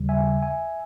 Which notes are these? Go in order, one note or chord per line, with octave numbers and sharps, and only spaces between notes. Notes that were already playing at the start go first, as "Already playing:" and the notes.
Already playing: D#2 C#3 G3
E5 G#5
E5 G#5